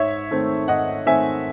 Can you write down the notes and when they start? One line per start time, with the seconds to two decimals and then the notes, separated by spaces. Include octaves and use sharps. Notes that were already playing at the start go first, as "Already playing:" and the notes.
Already playing: G#2 C#5 E5
0.31 D#3 A3 C4
0.68 G#2 D#5 F#5
1.06 D#3 A3 C4 E5 G#5